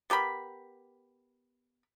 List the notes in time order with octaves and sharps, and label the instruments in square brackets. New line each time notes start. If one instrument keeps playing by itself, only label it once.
[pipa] B3 G4 A#4 B5